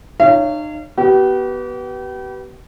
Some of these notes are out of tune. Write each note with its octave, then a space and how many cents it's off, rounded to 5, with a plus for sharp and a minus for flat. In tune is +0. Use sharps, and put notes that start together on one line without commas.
D#4 -40 C#5 +5 F5 -35
B3 -15 G4 -40